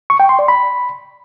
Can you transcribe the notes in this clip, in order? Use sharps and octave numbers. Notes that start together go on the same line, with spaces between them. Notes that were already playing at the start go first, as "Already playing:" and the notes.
C#6
G5
C6
D5
B5